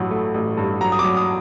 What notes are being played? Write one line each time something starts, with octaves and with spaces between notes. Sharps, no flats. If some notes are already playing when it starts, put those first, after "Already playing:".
Already playing: A1 G2 F#3
A3
A1
G2
F#3 A#5
D#6
F#3 D6
D#6